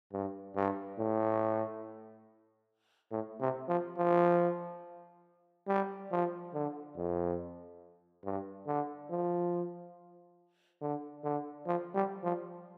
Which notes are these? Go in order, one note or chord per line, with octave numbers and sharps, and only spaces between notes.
G2
G2
A2
A2
C3
F3
F3
G3
F3
D3
F2
G2
D3
F3
D3
D3
F3
G3
F3